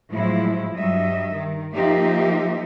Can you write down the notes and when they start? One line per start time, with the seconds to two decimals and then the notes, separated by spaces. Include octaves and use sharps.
0.11 A2 F3 F#3 G#3 E4
0.74 G2 F#3 G3 D#5 E5
1.35 D#3
1.74 F3 A#3 D#4 G4 E5